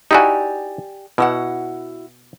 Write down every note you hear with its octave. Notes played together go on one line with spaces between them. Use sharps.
D#4 E4 F#4 G4 D5 G#5
B2 E4 F#4 F#5